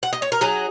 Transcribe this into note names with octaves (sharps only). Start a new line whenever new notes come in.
F#5
D#5
C#5
A#4
F#3 D#4 G#4